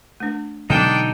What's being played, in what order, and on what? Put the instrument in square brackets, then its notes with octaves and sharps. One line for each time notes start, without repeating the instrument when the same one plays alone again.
[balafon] A3 D4
[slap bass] B2 D3 F#3 [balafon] G#3 [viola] D4 G5 [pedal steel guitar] D#4 A4